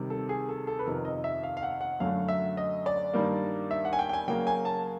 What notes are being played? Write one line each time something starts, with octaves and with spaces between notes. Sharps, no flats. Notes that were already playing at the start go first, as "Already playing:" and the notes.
Already playing: C3 D#3 G3
A4
G#4
A4
A4
B4
F2 C3 D#3 A#4
D#5
E5
F5
F5
F#5
F#5
F#2 D3 F#3 A3 F5
E5
D#5
D5
G2 D#3 G3 A#3
E5
F#5
G#5
G5
G5
G#5
C#3 F#3 A#3 G5
G#5
A5